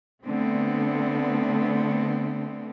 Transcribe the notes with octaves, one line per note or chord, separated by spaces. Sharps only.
D3 A3 B3 C4